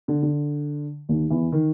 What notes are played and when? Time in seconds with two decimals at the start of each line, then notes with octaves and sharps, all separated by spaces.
0.08 D3
0.23 D3
1.09 D#2 D#3
1.30 E2 E3
1.52 D#3